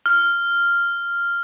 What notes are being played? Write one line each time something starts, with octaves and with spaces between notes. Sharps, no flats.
F6